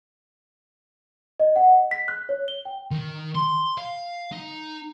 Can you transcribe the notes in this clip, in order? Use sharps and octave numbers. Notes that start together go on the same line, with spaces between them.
D#5
F#5
D#5
B6
F#6
C#5
G7
G5
D#3
C6
F5
D#4